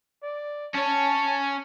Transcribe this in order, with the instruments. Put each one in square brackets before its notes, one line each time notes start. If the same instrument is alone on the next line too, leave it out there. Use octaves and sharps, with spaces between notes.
[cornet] D5
[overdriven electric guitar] C#4 C#5 [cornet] A5